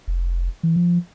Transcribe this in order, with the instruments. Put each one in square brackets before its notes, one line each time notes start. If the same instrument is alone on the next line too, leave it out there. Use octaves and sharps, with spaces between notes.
[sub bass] F1
E3
F3